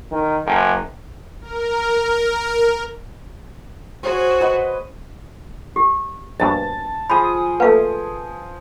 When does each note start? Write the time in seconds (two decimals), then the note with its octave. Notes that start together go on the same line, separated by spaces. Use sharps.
0.11 D#3
0.46 F#1
1.41 A#4
4.03 F#4 G#4 C5 C#5
4.41 B4 D#5 F#5
5.76 G4
6.40 A#1 G2 B2 A5
7.10 F3 G#4 B5 D#6
7.60 A3 A#3 B4 F5